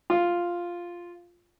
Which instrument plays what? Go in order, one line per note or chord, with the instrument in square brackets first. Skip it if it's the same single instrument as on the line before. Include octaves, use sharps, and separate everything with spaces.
[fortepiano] F4